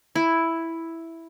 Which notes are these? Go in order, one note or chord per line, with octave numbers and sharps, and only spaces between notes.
E4